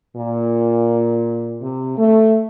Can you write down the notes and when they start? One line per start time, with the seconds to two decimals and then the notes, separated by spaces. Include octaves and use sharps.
0.16 A#2
1.61 C3
1.98 A3